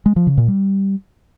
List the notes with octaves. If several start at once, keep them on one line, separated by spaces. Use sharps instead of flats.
G#3
F3
C#3
A#2
G3